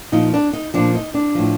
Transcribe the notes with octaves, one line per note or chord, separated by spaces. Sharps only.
A#2 F3 D#4
D4
D#4
A#2 F3 D4
D#4
D4
A2 F3